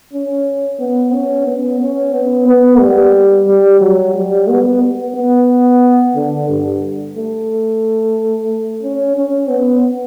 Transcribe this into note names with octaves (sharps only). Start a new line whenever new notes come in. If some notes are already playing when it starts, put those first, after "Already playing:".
C#4
B3
C#4
B3
C#4
B3
B3
G3
G3
F#3
G3
B3
B3
D3
G2
A3
C#4
C#4
B3